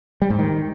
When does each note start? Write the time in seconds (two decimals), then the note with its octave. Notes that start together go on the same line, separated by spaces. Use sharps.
0.22 G3
0.30 G#2
0.39 D#3